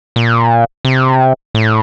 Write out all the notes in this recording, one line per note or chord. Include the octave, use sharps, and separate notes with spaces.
A#2
C3
A2